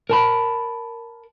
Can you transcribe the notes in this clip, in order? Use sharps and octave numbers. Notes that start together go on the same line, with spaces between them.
A#4 A5 B5